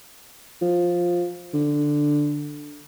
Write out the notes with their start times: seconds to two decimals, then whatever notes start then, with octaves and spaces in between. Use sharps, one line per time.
0.62 F3
1.54 D3